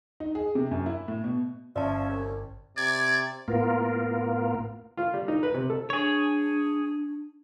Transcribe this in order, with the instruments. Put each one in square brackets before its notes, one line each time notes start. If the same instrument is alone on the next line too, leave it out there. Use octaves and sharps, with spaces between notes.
[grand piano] D#4
G#4
C3
F#2
E4
A2
B2
[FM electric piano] G1 [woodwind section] F3 E5 [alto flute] C#4 [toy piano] D5 A5
[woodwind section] C2
[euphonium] C3 [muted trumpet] D5 [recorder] G#6
[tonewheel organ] A2 A#3 B3 F4 A#4
[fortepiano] F4
G3
D#4
B4
C3
A4
[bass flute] D4 [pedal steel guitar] G#4 C#5